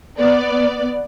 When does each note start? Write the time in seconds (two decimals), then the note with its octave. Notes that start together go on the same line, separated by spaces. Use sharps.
0.19 B3 D5